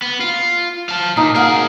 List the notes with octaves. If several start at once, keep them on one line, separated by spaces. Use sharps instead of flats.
B3
F4
F5 A5
A#2 D#4
G#4 A#4 F5 F#5